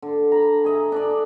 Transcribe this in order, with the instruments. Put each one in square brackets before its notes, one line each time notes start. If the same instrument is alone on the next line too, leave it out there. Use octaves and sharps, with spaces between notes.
[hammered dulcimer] D3
A#5 B5
G#4 D#5 E5
D4 A4 D5